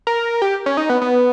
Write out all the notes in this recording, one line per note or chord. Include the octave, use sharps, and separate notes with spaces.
A#4
G4
C#4
D#4
B3
B3